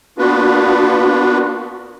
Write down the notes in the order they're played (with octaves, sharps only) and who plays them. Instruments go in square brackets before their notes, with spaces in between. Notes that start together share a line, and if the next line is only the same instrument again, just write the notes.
[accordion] A#3 B3 D4 F4 F#4 B4